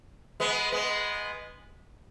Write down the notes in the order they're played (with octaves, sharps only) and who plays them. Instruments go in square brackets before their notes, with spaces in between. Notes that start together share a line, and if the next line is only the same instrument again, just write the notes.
[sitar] G#3 B3
G#3 B3